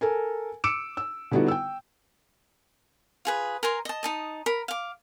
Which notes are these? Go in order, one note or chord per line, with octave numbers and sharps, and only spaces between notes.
A4 A#4 G#5
D6 E6 C#7 D7 E7
E6
D3 G3 B3 D#4 E4 F#4
G5 E6
F4 G#4 B4
A#4 G#5 A#5 C6
D#5 A5
D#4 A5 D#6
A#4 B5
F5 D6